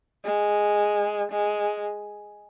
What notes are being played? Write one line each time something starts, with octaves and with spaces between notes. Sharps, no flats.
G#3
G#3